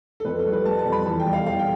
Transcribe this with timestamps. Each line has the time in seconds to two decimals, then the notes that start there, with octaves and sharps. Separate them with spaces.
0.20 A4
0.25 F2 B4
0.39 A4
0.46 G3
0.53 B4
0.65 G3 A5
0.79 A5
0.86 F2
0.92 B5
1.06 E2 A5
1.20 G5
1.26 G3
1.33 F5
1.46 E2 F5
1.59 G5